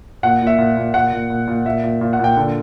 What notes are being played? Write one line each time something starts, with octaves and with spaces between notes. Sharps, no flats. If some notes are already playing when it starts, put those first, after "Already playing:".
A#2 F#5
A#2
E5
A#2
A#2
A#2 F#5
A#2
A#2
A#2
A#2 E5
A#2
A#2
F#5
A#2 G5
D3